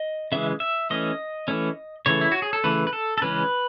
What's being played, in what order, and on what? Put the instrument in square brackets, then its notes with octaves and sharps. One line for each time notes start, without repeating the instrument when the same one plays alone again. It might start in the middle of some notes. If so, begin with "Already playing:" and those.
Already playing: [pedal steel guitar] D#5
C#3 E3 G#3 E5
E5
E3 A3 C#4 D#5
E3 A3 C#4
C#3 E3 A3 C#5
E4
F#4
G#4
A4
C#3 E3 A3 B4
B4
A4
A4
C#3 E3 G#3 C#4 B4